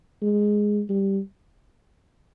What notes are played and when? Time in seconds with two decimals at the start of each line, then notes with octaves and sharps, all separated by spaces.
0.22 G#3
0.89 G3